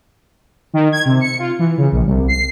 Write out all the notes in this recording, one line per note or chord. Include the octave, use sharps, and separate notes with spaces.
D#3
G#6
C3
C#7
F4
E3
C#3
A#1
C2
C7